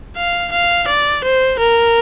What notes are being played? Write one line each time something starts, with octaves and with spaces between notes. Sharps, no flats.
F5
F5
D5
C5
A#4